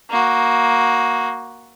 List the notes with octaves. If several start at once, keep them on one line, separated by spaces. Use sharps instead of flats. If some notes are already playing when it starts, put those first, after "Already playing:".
A#3 F#4